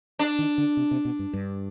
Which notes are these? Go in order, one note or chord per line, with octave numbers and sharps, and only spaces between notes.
D4
D#3
D3
C3
C3
B2
G2
G2